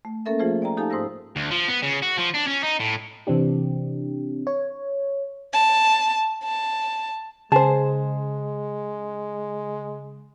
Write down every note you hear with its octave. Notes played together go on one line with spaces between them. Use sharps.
A3
A#3 C#4 A4 A#4 E5
F3 A3 F4 G#4 C5
D5 G5 A#5
D#4 G4 A4 F5 G#5 A5
G#2 C5 D#6 E6 A#6
D2
F3
B3
C#3
F#4
F3
D4
C#4
D#4
A2
C3 E3 C4 D4 G4
C#5
A5
A5
C#3 G#3 G#4 C5 A5